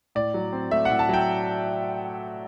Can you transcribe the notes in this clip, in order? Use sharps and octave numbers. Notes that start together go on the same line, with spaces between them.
A2 D5
F#3
C4
A3 E5
A2 F#5
A5
F#3 G5